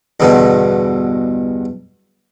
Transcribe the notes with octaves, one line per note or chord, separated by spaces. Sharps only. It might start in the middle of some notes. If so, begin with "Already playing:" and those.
E2 G2 B2 D3